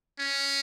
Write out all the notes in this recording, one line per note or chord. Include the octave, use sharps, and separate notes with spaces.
C#4